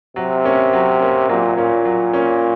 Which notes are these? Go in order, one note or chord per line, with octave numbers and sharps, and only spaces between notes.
C3 F#3
A#3 C#4
F#3
A#3 C#4
A#2 F#3
A#2 A#3 C#4
F#3
A#3 C#4